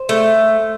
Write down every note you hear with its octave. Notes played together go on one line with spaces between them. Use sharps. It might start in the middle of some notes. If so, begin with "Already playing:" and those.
Already playing: C5
A3